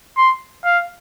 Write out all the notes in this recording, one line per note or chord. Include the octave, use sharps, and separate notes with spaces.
C6
F5